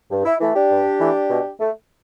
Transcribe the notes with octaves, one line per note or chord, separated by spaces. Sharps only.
G2
E4
E3 A3
D4 G4
G2
E3 A3
B2
A3